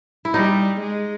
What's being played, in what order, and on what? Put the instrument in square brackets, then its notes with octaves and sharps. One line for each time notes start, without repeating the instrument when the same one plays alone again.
[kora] E4
[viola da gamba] G3 [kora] D#4
[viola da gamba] G#3